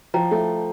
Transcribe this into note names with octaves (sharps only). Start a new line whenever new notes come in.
F3 G5 A#5
A3